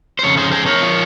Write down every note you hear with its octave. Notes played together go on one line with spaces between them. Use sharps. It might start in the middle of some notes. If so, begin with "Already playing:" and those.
C5
F2 C#3 C#5
G#4 C5
G#4 C5
A#4 C#5
F3